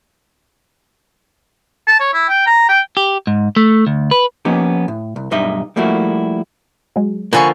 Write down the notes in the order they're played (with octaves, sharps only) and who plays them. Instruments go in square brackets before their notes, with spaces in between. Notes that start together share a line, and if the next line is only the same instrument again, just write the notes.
[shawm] A5
C#5
E4
G5
A#5
G5
[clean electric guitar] G4
G#2
A3
D2
B4
[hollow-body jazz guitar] F3 A#3 B3 C#4 D#4 G4
A2
C2
B1 G2 G3 D#4 D#5 E5
F3 G3 A3 A#3 E4 F#4
[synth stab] F#3 G#3
[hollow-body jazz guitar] D3 F3 A#3 [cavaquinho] B4 G#5 C#6